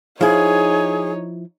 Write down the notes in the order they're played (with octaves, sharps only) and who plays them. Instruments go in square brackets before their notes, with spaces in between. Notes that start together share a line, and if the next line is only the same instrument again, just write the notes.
[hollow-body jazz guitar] F3 E4 [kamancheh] D#4 C#5 [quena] G#4